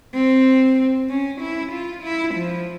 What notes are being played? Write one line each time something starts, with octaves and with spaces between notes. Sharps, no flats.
C4
C#4
E4
F4
E4
F3